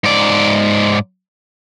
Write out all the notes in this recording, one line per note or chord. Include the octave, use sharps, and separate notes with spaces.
G#2 D5